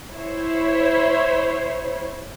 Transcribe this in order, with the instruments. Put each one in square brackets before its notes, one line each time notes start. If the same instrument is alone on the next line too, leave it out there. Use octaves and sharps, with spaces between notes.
[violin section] E4 C5 C#5